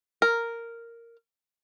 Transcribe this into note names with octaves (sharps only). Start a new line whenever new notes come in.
A#4